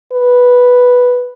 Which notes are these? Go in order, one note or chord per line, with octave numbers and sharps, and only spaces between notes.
B4